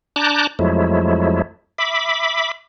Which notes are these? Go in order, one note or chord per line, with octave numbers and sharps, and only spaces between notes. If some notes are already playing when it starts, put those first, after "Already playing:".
D4 A5 A#5 D6 F#6 G6
F2 F3 F#3 G#3 A3 E4
E5 B5 D6